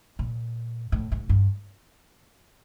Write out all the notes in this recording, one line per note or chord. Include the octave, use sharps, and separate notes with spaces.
A#2
A2
G#2
G2